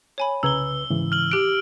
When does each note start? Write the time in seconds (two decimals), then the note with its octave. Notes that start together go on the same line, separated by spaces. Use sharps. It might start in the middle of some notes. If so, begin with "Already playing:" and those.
0.18 C#5 G#5 B5
0.43 C2 C#3 B4 A#5 E6 G#6 G7
0.90 G#2 C#3 E3
1.12 F6 F#7
1.31 G4 F#6 D7